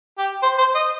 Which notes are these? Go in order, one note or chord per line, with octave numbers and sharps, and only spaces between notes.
G4
C5
C5
D#5